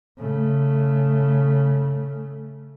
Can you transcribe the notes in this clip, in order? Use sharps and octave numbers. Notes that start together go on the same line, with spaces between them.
C#3 A3